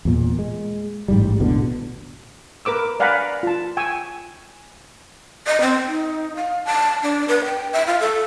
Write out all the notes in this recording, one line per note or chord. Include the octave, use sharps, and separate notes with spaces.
E2 A#2
G#3
A1 G#2 G3
A1 E2 B2 D3
A#4 B4 D6 E6
D5 F5 F#5 G#5 A#5 B5
F4 A5
G5 G#5 C#6 E6
D#5
C4
D#4
F5
A5
D4
B4
G5
E5
F4
A4